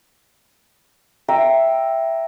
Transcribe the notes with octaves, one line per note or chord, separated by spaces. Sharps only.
E5 G5 A#5